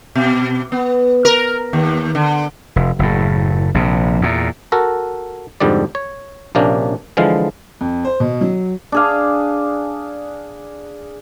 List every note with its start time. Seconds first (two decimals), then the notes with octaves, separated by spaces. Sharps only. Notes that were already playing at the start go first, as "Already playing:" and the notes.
0.15 B2
0.72 B3
1.25 A#4
1.73 D#2
2.15 D3
2.76 F1
2.99 F#1 A2
3.74 A#1 C3
4.21 E2 A#2
4.72 F#4 A4 A#4
5.60 F2 G#2 D3 G3 D5
5.95 C#5
6.55 A#1 C3 A#3 C#4 D4
7.17 D3 E3 F3 G#3 F5
7.81 F2
8.05 C5
8.20 B2
8.41 F#3
8.92 D4 G#4 F5